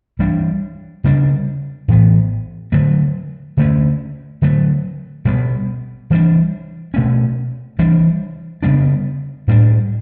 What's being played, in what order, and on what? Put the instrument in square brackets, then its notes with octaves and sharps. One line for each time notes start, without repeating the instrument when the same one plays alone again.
[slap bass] E3 G3 D4
C#3 G3 D4
A2 E3 B3
D3 F#3 A3
D3 A3 C#4
D3 F#3 A3
B2 G3 B3
E3 G3 D4
B2 A3 C#4
E3 G3 D4
C#3 G3 B3 D4
A2 G3 D4